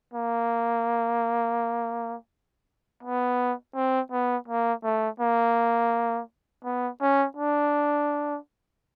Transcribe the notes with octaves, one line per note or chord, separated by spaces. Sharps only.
A#3
B3
C4
B3
A#3
A3
A#3
B3
C#4
D4